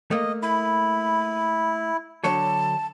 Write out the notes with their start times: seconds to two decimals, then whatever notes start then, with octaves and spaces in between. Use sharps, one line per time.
0.11 A3 A#3 D#5
0.43 E4 B5
2.24 D3 F#3 C#5 A5